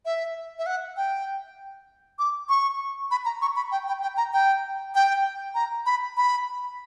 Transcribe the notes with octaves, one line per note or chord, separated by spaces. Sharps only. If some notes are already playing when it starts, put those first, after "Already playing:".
E5
E5
F#5
G5
D6
C#6
B5
A#5
C#6
B5
G5
G5
G5
A#5
G5
G5
A#5
B5
B5